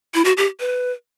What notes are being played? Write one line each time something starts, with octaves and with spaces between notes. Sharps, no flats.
E4
F#4
G4
B4